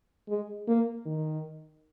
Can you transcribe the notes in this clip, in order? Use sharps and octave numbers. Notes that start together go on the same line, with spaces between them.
G#3
A#3
D#3